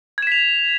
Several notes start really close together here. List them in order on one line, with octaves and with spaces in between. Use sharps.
G#6 E7 B6 F7